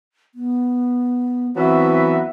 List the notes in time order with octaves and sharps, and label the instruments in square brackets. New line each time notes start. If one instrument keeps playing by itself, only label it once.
[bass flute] B3
[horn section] E3 F#3 B3 [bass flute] C4 [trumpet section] F#4 B4 E5